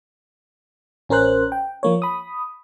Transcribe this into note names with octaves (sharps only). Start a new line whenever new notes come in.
A1 C#4 A#4 C5 F#6
G5
F3 A#3 C#5
B5 D#6